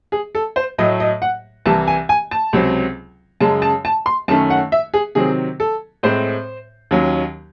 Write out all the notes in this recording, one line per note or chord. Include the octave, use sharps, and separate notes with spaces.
G#4
A4
C5
A2 F#3 A3 D#5
D#5
F#5
C2 C3 E3 A5
G#5
G#5
A5
C#2 C3 F#3 C4
F#2 C#3 G#3 A5
A5
A5
C6
F#2 D#3 A3 C#4 A5
F#5
E5
G#4
C3 D#3 F#3 C4 G#4
A4
A2 G#3 C4 C5
D#2 D#3 F#3 C#4